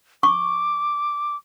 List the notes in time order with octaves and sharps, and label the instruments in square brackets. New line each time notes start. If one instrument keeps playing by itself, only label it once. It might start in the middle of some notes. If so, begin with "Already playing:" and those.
[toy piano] C#6 [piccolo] D6